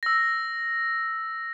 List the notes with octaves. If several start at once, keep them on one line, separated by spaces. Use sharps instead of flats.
E6 A#6